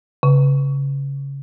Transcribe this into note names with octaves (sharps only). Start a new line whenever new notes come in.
C#3